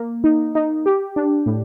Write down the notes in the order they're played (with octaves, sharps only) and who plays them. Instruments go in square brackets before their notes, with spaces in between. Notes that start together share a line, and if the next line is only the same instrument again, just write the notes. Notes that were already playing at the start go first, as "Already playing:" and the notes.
Already playing: [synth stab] A#3
D#4
D#4
G4
D4
A2